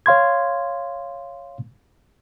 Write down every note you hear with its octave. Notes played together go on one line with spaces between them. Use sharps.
C#5 F5 C6 G#6